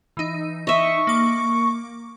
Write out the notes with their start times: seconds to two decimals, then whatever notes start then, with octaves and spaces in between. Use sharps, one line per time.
0.17 E3 D#4
0.67 D#5 E5 C#6
1.07 A#3 D6